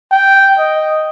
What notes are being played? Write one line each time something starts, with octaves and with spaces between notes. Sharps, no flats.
G5
D#5